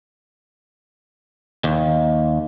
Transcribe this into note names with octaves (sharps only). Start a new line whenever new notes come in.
D#2